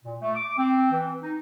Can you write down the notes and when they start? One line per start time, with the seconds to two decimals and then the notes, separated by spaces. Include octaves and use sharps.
0.04 A#2
0.21 A3
0.35 D6
0.57 C4
0.91 E3
1.23 D#4